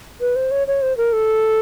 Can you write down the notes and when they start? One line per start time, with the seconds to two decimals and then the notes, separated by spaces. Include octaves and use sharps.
0.21 B4
0.36 C5
0.51 C#5
0.67 C#5
0.82 C5
0.97 A#4
1.13 A4